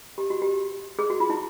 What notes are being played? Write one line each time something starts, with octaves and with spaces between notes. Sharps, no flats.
G4
F#4
G4
G#4
F#4
F4
E4